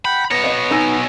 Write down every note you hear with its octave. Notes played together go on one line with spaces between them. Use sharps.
F#5 G5 B5
B2 B3 C#5 A#6
D#5 F5
D#4 G#5 E6 A#6